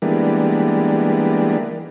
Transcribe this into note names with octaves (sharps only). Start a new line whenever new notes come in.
E3 G3 G#3 A#3 B3 D4